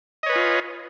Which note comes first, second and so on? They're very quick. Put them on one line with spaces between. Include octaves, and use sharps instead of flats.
D#5 C#5 B4 G#5 F4